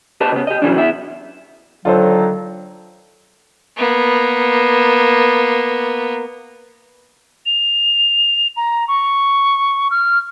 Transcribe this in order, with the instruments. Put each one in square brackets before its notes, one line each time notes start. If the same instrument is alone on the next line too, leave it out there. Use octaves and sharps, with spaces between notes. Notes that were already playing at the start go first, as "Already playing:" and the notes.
[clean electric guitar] G4 B4 D#5 A5
C#3 B3
G4 D#5
C3 E3 F#3 G3 C#4 D4
B3 E4 E5
[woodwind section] D3 D#3 F#3 [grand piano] F4 A4 C5
[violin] A#3 B3
[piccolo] F7
A#5
C#6
F6